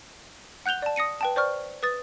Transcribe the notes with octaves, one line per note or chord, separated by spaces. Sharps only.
F#5 F#6 G6 F7 G7
D5 A5
D#6 A#6 C#7 D#7
B4 G5 A5
C5 D5 C#6 F6
B4 D#6 A6